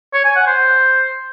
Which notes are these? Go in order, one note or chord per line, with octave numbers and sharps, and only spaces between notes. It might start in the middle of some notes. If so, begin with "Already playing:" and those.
C#5
G#5
F#5
C5